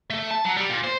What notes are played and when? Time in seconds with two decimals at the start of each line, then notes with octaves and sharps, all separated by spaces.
0.10 A3
0.31 A5
0.45 F#3
0.57 G3
0.70 A#2
0.84 C5